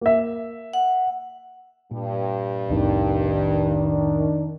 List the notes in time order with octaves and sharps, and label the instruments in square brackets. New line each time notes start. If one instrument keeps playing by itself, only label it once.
[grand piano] A#3 E5
[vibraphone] F#5
[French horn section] G2 [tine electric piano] A#2
[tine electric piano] C2 F2 A2 [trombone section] D#3 D4